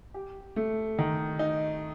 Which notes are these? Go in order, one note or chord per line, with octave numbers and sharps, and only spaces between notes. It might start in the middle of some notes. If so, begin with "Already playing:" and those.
G4
A3
D#3
D#4